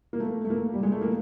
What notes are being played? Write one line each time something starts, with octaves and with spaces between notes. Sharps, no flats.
A#3
A3
A3
A#3
G3
G#3
A3
A#3